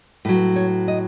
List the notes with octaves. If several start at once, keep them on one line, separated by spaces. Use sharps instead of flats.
A2 F#3 B4
C#5
D#5